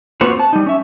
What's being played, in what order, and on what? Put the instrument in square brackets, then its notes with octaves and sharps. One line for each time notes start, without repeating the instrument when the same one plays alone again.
[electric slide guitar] A#3 C4 F4 F#4 B4 C5
A5
G3 D#4
C#4 E5